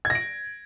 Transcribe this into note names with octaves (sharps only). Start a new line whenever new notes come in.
G#6
A#6
D7